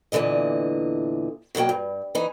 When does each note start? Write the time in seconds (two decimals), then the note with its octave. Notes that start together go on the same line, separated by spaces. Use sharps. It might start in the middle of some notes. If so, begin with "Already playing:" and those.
0.12 E2 A#2 D3 E3 D#5
1.55 B2 D#3 F#3 A#3 G5
1.69 G2
2.15 E3 D#4